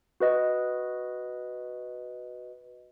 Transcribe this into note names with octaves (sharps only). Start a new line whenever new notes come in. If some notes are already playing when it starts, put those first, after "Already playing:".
F#4 B4 D#5